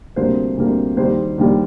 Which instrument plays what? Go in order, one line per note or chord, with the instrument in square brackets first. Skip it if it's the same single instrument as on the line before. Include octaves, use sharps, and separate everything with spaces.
[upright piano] D2 C3 G3 A#3 C5
D2 C3 G3 A#3
D#2 D#3 G3 C5
D#2 D#3 G3